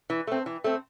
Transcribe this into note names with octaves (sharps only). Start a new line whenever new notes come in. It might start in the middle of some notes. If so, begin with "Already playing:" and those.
E3
A3 C4
E3
A3 C4